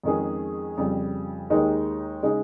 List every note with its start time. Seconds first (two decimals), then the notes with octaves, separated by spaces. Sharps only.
0.03 F2 D#3 G#3 C#4 G#4
0.77 F2 C#3 G3
1.50 D#2 D#3 G#3 D#4 G4
2.23 C#3 G#3 D#4